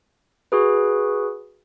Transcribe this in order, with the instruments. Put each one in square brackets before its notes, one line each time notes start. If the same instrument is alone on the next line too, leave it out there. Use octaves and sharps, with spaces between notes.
[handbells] F#4 G#4 B4